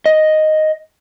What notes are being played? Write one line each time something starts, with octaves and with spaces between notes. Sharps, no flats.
D#5